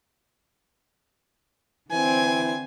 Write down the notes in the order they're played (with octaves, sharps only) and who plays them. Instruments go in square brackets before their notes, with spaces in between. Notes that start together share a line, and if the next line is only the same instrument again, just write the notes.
[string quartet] D3 C4 [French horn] E3 [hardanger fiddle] G#5